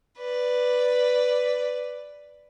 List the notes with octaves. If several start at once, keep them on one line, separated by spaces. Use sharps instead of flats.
B4 D5